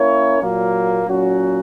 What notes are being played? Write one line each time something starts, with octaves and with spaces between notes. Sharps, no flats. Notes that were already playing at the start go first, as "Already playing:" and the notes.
Already playing: A#3 C#4 E4 A#4 C#5
A#2 F#3 A#3
A#2 F#3 C#4 F#4